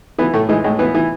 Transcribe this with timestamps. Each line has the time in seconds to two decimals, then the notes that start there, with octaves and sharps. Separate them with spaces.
0.19 E3 B3
0.34 A2 A3
0.49 E3 G#3
0.64 A2 G#3
0.79 E3 B3
0.95 E3